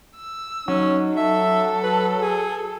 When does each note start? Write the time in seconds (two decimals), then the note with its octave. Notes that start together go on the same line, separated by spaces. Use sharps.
0.16 E6
0.68 F#3 C#4 D#4
1.17 A4 E5
1.83 F#4 B4
2.20 G#4